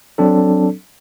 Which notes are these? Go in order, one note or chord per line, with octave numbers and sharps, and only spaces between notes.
F#3 C4 D4 A4